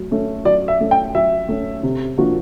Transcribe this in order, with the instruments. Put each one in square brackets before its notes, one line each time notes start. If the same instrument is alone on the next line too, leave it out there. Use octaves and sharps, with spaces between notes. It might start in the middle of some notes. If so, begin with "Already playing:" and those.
Already playing: [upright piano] F#3 A3
A3 C#4
[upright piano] F#3 [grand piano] D5
[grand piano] E5
[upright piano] A3 C#4
[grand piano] G5
[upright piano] F#3 [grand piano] E5
[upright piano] A3 C#4
C3
F3 A#3 D4 F#4